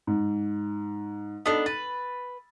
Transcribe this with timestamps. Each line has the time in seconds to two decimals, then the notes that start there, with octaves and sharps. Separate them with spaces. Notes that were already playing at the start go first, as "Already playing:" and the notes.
0.07 G#2
1.46 B3 D4 D#4 A4
1.66 B4 A6